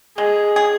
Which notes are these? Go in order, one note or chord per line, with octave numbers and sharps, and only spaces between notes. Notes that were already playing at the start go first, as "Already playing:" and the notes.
G#3 G#4
G#4